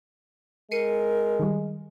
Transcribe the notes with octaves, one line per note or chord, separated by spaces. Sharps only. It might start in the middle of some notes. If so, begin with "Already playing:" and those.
G#3 A#4 C7 C#7 D#7
D#3 G3